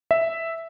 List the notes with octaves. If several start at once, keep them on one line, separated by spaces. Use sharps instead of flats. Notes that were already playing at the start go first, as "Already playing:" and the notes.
E5